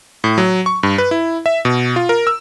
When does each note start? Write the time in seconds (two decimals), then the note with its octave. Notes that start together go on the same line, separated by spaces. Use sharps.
0.24 A2
0.38 F#3
0.66 C#6
0.83 G2
0.98 B4
1.11 E4
1.46 E5
1.65 B2
1.96 F4
2.09 A#4
2.27 E6